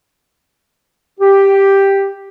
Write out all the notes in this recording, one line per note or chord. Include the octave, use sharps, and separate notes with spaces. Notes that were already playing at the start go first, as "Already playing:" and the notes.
G4